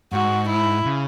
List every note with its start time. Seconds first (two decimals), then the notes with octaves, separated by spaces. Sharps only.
0.13 G#2 F#4
0.49 E4
0.85 C#3